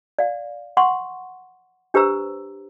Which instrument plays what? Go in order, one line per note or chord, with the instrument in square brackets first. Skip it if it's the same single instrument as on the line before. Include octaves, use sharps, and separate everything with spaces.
[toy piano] D5 F5
F#5 C6 C#6
D4 G4 B4 C5 A#5 E6